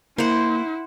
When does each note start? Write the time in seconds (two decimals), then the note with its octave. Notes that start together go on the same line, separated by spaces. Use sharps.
0.18 A#3 E4 C5 F#5